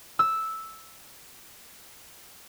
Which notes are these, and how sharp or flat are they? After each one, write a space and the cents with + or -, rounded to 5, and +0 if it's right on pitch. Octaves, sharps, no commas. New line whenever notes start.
E6 -5